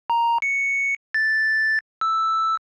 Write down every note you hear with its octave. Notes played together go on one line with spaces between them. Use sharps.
A#5
C#7
A6
E6